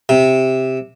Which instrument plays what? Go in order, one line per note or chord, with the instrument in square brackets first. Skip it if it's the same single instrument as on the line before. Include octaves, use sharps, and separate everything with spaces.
[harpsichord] C3